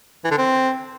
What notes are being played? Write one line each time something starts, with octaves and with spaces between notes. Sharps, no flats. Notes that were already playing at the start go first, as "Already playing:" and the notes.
E3
D3
C4